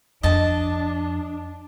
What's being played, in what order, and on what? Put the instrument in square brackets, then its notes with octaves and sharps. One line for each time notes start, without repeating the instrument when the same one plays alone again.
[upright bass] F2 [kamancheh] D4 [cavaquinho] D#5 A5